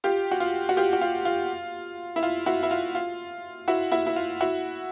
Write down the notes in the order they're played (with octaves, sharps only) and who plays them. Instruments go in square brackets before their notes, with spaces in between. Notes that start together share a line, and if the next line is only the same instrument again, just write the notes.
[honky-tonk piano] F4 G4
F#4
F4
F#4
F4 G4
F#4
F4
F4
E4
F4
E4 F#4
E4
F4
F4
E4 F#4
E4 F#4
E4
F4
E4 F#4